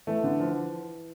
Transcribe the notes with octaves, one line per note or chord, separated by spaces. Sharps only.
E3 A3
D3
F3